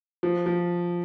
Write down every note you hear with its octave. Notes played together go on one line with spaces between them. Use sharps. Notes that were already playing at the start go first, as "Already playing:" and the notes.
F3
F3